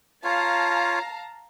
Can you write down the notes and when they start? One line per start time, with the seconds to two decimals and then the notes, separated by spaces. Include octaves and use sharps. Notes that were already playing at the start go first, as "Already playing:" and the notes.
0.24 F4 C#5 F5 A5 A#5